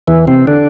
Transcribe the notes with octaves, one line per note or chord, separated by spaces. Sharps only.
E2 E3
C3 C4
D3 D4